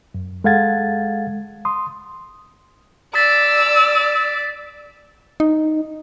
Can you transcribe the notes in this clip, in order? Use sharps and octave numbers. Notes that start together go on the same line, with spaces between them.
F#2
G#3 A4 F5 F#5 G#6 A6
C6 D#6
D5 E6 A6 B6
D#4